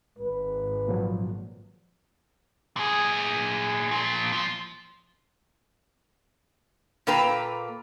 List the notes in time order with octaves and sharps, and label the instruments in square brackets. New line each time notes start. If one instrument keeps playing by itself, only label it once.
[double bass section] G#1 [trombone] B4
[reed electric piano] A#2 F3 F#3
[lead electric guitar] A#2 G#4
A#2 F3
F3
[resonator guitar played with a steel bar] A#2 A#3 A4 B4 G5 A#5